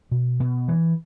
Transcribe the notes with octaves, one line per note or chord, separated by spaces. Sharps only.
B2
B2
E3